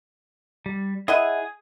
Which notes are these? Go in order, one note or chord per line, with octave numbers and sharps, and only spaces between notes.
G3
E4 G#4 D#5 F#5 G#5